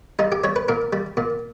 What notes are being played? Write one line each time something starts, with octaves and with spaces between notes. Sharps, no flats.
G3 D#4
G4
G3 C#5
B4
A#2 A#4
G3
A#2